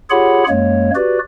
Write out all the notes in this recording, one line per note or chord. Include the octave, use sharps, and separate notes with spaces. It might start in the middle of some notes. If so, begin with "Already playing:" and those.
F4 G4 G#4 C#5 F#5 B5
F#2 G#3 A#3 C#5
F#4 G4 B4 D5